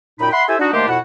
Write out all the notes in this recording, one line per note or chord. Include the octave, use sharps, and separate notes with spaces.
F#2 A#2 D#4 G5 B5
E5 F#5 B5 C6
E4 G4 A4 C5 E5 G#5
D4 D#4 F#4
D#3 A3 A#3 D4 G4 C5
F2 B2 E4 F#4 F#5